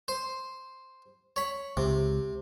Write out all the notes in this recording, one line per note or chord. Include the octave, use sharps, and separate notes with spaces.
C5
C#5 B5
C#2 C3